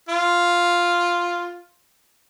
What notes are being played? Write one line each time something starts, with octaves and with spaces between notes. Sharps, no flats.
F4